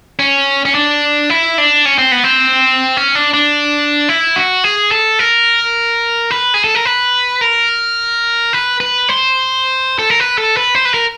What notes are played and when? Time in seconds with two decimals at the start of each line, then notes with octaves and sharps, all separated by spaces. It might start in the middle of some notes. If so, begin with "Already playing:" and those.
0.19 C#4
0.65 C#4
0.75 D4
1.30 E4
1.58 D4
1.86 C#4
1.98 C4
2.12 B3
2.24 C4
2.97 C#4
3.15 D4
3.34 D4
4.09 E4
4.36 F#4
4.64 G#4
4.91 A4
5.19 A#4
6.31 B4
6.54 G#4
6.64 A4
6.75 A#4
6.85 B4
7.41 A#4
8.53 B4
8.80 B4
9.09 C5
9.99 A4
10.10 A#4
10.20 B4
10.38 A4
10.57 B4
10.75 C5
10.85 B4
10.94 A#4